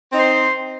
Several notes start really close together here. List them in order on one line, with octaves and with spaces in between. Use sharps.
C4 D#4 C5